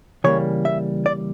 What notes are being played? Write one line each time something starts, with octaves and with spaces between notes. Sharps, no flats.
C#3 E3 G3 A#3 C#5
E5
D5